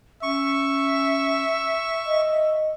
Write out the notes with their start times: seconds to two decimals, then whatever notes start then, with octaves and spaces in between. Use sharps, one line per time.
0.23 C#4 E5 C#6
2.06 D#5